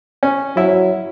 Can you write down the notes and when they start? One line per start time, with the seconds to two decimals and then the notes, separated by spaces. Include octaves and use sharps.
0.23 C#4
0.56 F#3 E4